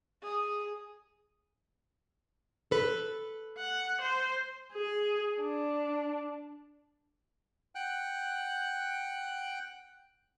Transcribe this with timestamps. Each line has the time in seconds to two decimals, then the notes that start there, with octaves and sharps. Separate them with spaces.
0.23 G#4
2.71 A4 B4
3.58 F#5
4.01 C5
4.74 G#4
5.40 D4
7.75 F#5 G5 F#6